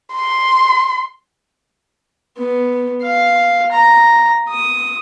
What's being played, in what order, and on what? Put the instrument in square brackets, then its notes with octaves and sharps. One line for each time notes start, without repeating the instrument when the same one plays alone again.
[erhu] C6
[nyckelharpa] B3
F5
A#5
D#6